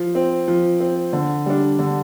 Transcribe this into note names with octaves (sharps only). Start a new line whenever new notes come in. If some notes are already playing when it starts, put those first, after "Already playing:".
Already playing: F3
C4
F3
C4
D3
G3 D4
D3